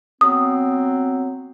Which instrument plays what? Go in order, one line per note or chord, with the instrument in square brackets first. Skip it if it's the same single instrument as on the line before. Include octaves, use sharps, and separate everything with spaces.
[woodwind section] F#3 B3 C4 [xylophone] D#6